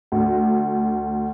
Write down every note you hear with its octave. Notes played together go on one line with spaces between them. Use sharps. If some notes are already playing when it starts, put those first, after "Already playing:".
D2